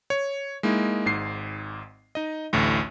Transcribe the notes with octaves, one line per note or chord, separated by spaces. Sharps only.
C#5
G#3 A#3 D#4 E4
G#1 G#2 C7
D#4 D#5
A1 D2 A2